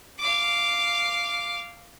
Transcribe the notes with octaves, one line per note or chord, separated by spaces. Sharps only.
F5 D6